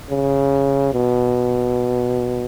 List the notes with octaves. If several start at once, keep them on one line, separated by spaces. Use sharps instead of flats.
C#3
B2